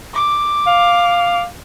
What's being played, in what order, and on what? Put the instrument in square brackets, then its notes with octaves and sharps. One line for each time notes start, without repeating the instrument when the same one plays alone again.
[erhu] D6
[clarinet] F5